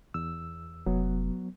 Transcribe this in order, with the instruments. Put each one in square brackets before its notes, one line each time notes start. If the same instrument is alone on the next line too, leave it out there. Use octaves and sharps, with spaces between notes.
[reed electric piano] E2 E6
[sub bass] F1 [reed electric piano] F#3 B3